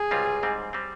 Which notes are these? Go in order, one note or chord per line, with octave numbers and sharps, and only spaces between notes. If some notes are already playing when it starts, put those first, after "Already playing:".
Already playing: G#4
C#2 C3 G3 C4 F4
G#2 G3 C4
G3 C4